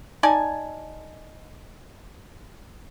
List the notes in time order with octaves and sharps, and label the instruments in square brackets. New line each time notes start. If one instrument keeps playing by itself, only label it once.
[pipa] D#4 D5 G#5 A5